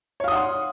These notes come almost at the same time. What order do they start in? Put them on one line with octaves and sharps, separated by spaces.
C#5 F5 D#6 F#5 C6